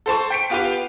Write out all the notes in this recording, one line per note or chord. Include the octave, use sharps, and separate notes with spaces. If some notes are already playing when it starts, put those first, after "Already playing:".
A4 C5 A5 C#6
G5 B6 D7
B3 F4 G4 B4